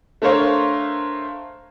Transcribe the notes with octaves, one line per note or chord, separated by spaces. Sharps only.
A3 D4 A#4 C5 C#5 F5